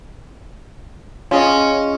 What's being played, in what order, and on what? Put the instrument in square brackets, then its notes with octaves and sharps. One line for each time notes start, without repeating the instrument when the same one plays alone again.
[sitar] C#4 [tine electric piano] F4 G#4 D#5